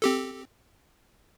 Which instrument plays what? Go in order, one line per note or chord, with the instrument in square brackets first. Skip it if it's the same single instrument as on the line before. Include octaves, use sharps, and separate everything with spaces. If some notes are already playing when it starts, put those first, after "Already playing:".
[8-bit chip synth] C4 G4 A4